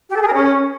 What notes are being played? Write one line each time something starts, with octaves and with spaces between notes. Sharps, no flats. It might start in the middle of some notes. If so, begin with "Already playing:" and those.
G4
A4
G#4
A#4
C#4